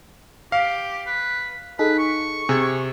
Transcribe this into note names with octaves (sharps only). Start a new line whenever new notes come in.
G4 F5
B4
D#4 G#4 A4 B4
C#6
C3 G#4 G#6